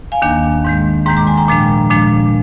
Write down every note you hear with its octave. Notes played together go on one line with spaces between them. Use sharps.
F5 G#5
D#2 D#3 A#3 D4
G#2 D#3 G#3
G#2 D#3 G#3 G5 A#5
A#5 D6
G#5 C6
G5 A#5
A#2 F3 G#3 D4 G5 A#5
A#2 F3 G#3 D4